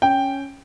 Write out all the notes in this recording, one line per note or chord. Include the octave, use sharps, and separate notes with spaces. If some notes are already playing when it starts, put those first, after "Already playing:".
C#4 G5